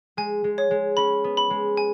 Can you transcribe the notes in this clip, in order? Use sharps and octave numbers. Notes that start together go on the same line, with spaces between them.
G#3 G#5
G#3
C#5
G#3
C#4 B5
B3
B5
G#3
G#5